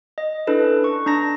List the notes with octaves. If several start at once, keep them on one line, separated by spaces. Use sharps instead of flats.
D#5
C#4 D4 E4 A4 B4
C#6
D4 A5 A#5 A#6